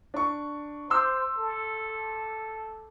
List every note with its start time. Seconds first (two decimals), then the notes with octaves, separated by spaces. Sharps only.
0.14 D4 C#6
0.90 C5 C6 D6 E6
1.38 A4